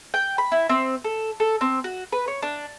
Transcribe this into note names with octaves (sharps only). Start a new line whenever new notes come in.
G5
B5
E4
C4
A4
A4
C4
F#4
B4
C#5
D4